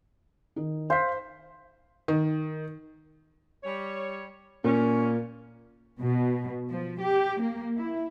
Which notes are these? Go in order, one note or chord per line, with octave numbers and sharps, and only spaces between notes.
D#3 D#4
C5 F5 B6
D#3
G3 C#5
A#2 A#3 C#4
B2
F3
G4
A#3
E4